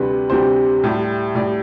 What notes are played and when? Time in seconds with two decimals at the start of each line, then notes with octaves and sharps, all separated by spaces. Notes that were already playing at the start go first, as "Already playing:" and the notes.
Already playing: D2 C3 G3 B4
0.30 D2 C3 G3 C5
0.84 A2 G3
1.35 A2 G3 D5